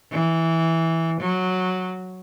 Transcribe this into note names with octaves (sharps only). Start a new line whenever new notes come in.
E3
F#3